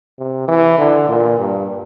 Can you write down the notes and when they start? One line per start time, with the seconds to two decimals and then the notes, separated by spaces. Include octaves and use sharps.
0.19 C3
0.48 E3
0.78 D3
1.08 A#2
1.39 G2